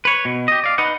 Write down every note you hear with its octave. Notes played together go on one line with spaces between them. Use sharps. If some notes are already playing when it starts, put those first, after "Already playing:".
B4 C#5
B2
G4 D#5
D5 F5
D#4 B4 D#5 F#5